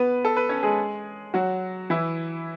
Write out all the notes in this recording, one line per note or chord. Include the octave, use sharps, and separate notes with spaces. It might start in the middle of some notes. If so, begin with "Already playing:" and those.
Already playing: B3 B4
A4
B4
C#4 C#5
G#3 G#4
F#3 F#4
E3 E4